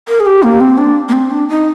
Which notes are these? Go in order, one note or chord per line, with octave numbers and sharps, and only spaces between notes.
A#4
G#4
G4
A#3
C4
D4
A#3
C4
D4
D#4